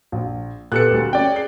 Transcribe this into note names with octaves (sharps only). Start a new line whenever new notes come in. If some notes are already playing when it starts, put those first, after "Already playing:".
A#1
A#2 B3 G4 A4 F#6 C#7
D2 G3
C#4 D5 G5
G#4 C7